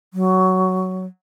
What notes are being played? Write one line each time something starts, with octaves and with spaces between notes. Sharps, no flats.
F#3